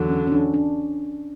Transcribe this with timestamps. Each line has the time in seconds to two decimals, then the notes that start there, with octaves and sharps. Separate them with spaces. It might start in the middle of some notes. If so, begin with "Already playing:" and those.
Already playing: E2 D3 F#3
0.09 C#4
0.27 C#4
0.32 D4
0.54 D4